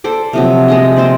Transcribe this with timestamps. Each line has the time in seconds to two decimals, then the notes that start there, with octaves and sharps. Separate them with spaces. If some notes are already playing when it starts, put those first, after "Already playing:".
0.04 A4 C5 D5
0.33 C3 F3 F#3
0.68 G#3 G#4 D#5
0.96 C4 C5 D5